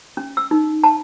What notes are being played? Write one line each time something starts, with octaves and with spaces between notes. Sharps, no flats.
C#4
E6
D#4
A5